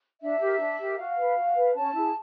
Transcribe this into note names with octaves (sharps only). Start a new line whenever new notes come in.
D4 E5
G4 A#4
D4
G4 A#4
F#4 F5
B4
F#4
B4
C#4 A5
E4 G#4